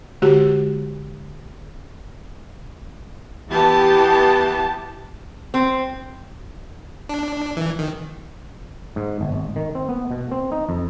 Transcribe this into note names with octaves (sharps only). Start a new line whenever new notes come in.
D3 G#3 F#4 G4
E3 B3 G4 A5
C4
D4
E3
D#3
G#2
G1
G#1
D#3
C4
B3
B2
C4
D#4
F2